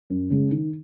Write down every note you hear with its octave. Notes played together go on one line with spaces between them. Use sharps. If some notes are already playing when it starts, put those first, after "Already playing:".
F#2
C#3 G#3
D#3